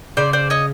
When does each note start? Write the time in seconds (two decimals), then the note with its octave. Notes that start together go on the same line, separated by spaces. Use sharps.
0.17 C#3 C5 D5
0.33 C5 D5
0.50 C#5 D#5